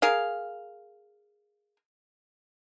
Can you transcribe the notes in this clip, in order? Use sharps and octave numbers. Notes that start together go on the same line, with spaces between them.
G#4 A#4 F5